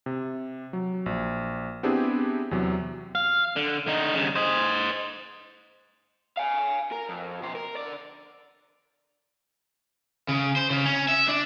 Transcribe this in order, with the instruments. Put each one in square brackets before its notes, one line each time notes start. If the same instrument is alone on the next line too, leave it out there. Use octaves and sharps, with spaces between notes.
[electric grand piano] C3
F#3
A#1
B3 C4 D4 E4 G4 G#4
E2 C3 F#3
[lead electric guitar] F5
D3
D3 D#4
G2 C#3
C5 D#5
[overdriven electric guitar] F5 G#5
A#4
F2
B2 C5
A#4
D3 D5
C#3
C5
C#3
C#4
E5
D4